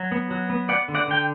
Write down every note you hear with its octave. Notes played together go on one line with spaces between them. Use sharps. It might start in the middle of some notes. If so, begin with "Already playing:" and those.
Already playing: F#3
B3
F#3
B3
B3 D5 F#5
D3
D5 F#5
D3 G5